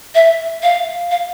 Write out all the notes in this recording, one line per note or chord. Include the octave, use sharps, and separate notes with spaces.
E5
F5
F5